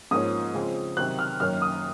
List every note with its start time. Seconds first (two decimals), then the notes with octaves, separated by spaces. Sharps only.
0.11 G#2 F3 A#3 C#4 D#6
0.54 C#3 F3 G#3 C4
0.97 C3 D#3 F#3 F#6
1.19 F6
1.40 F#2 D#3 A#3 C#4 F6
1.62 D#6